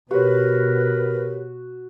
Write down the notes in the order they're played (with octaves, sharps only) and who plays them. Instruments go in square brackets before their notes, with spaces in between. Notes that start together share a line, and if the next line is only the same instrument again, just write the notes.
[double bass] B2 [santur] F#4 [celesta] G4 C#5 [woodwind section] A#4 B4